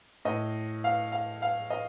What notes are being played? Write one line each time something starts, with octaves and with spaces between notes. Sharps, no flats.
A2 D#5
F5
F5
F5
D#5